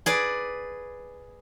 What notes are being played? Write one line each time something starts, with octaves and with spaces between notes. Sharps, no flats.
G#4 B4 D5